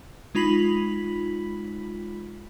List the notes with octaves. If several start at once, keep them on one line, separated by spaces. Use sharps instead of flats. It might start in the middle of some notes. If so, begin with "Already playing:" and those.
G#3 D#4 F4 B5 B6 F#7